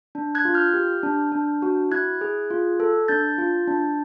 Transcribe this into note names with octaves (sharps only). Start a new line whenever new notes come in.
D4
F#6 G#6
F4
F6 G6
G4
D4
D4
F#4
E4 F#6 G#6
G#4
F4
A4
D4 G6 A6
F4
D4